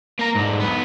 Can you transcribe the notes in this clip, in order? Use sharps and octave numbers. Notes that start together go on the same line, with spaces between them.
A#3 A#5
G#2 D3
B1 B3